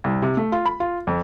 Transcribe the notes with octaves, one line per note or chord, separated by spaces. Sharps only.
C2
C3
A3
F4
B5
F4
F2